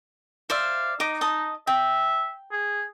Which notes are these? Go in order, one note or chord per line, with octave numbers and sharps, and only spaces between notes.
C5 D5 E5 F5
D#4 D#5 D6
D#5 A5 D#6
E5 G5
G#4